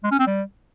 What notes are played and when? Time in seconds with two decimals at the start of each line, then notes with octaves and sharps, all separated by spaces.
0.04 G#3
0.11 C#4
0.19 C4
0.27 G3